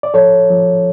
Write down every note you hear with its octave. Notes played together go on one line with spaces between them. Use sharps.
D5
F3 A4 C#5
F3